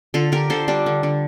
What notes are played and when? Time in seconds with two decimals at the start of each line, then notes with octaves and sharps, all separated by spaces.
0.14 D3 F4 A4
0.32 D3 G4 A#4
0.50 D3 A4 C5
0.68 G3 D4
0.86 D3
1.03 D3